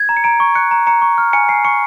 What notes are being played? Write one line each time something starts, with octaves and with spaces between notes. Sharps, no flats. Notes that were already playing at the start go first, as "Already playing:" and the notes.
Already playing: G#6
A#5
C#7
A#5 D7
C#6
F#6 C#7
A#5
A#5 C#7
C#6
F6
G#5 C#7
G#5 C7
C#6 C#7